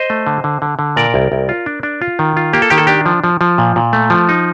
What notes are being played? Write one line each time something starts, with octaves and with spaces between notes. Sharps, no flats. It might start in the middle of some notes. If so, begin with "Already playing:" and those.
Already playing: C5 D#5
A3
D3
D3
D3
D3
A#2 A#4 D5
C2
C2
F4
D4
D4
F4
D#3
F4
A#3 G4
A4
D#3 G4
A4
D4 G4
F3
F3
F3
A#2
A#2
A3
F3
D#4